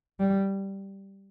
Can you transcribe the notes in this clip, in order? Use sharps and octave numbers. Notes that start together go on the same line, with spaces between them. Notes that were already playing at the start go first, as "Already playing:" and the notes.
G3